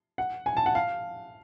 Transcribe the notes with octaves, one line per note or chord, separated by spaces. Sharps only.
F#5
G#5
A5
F#5
F5